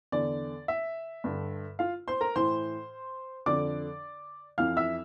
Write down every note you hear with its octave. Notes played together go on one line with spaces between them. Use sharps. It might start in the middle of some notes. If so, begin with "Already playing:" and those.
E2 D3 D5
E5
G2 D3
F4 F5
C5 C6
A#4 A#5
A2 E3 C5 C6
F2 D3 D5 D6
F2 E3 F5 F6
E5 E6